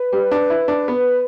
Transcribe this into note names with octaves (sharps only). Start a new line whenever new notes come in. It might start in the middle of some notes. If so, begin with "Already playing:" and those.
Already playing: B4
G3
D4
E4
D4
B3